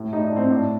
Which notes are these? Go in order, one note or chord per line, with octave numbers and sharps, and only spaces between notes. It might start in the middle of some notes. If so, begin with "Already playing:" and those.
Already playing: A2
A2 D#4
D4
A2 C4
A2 D4